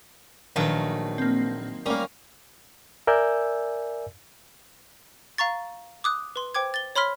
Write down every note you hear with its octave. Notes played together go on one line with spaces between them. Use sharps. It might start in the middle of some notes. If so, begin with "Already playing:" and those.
A#1 D#3 F#3 A3 B4
A#3 C4
G3 A#3 C#4 A#4
A#4 D5 E5 G#5 E6 G6
F5 A#5 C#6 A6
D6 D#6 F#6
B4 C6
C5 G5 D6 G#6
A6 G7
C#5 B5 C6 F6 B6